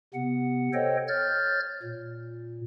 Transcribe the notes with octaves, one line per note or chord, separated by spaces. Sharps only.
C3 B3 F#5
A4 C5 C#5 D#5 G5
C#5 F6 G6 A6
A#2